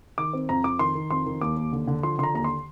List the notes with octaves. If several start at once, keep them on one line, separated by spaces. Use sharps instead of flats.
D#3 D6
C4
F2 A#5
F2 D6
D#3 C6
D#3
F2 C6
D#3
D#2 D6
D#2
D3
D3
F3 C6
D3 A#5 C6
D#2 A#5
C6